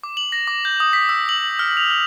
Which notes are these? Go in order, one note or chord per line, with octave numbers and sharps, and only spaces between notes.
D6
F#7
A#6
D6
G6
D#6
B6
E6
F#7
F6
F7
F6